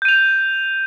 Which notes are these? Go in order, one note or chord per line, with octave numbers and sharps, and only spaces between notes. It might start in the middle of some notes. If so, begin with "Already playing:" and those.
G6 D#7 F7